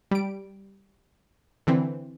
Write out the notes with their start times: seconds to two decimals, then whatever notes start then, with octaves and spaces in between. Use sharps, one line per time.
0.11 G3 D7
1.67 D3 E3 C4